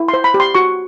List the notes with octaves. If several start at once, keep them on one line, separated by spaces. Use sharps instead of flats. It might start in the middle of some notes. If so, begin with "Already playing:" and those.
Already playing: E4
C6
C5
B5
G4
C6
F#4 C#6